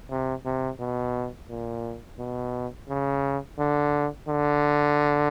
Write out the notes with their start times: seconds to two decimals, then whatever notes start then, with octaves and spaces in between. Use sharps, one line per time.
0.10 C3
0.45 C3
0.80 B2
1.49 A#2
2.19 B2
2.89 C#3
3.59 D3
4.28 D3